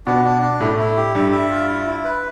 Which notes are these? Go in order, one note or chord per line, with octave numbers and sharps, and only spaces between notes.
B2 B3 D4
D4
D4
A2 A3 E4
E4
G4
G2 G3 E5
E5
F4
E4
E4
B4